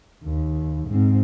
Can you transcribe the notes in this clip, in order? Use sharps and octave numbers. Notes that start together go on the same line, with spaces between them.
D#2
G#2 C4